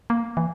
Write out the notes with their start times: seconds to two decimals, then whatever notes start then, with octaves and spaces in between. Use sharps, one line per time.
0.10 A#3
0.37 E3